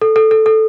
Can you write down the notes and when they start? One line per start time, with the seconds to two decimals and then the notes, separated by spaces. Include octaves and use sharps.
0.02 A4
0.16 A4
0.31 A4
0.46 A4